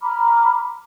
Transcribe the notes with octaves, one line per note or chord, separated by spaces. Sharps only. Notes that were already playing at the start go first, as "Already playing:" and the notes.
A#5 B5 D6 F6